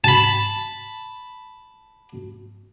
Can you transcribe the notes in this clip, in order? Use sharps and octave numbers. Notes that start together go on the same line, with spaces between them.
A5 B5